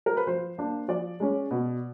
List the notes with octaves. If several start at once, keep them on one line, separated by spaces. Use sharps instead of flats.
A#4
B4
F3 C5
A#3 D4
F3 D5
G#3 C#4
B2